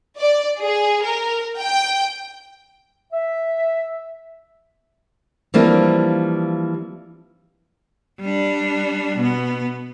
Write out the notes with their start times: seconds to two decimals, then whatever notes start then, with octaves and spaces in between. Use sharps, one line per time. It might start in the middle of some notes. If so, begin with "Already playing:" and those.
0.19 D5
0.61 G#4
1.05 A#4
1.59 G5
3.12 E5
5.54 E3 F3 G3 A#3 C4 D4
8.20 G3 D4
9.18 B2 B3